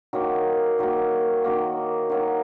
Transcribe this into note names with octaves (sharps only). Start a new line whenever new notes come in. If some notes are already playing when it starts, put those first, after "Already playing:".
D#3 F#3 A#3
D#3 F#3 A#3
D#3 F#3 A#3
D#3 F#3 A#3